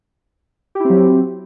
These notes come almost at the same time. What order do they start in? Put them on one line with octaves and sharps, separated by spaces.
G4 E4 C4 F#3